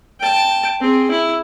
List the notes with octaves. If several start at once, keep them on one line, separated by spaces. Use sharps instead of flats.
G5 A5
C4 G#4
E4